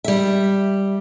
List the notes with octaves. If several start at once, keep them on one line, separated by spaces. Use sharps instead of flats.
G3 E5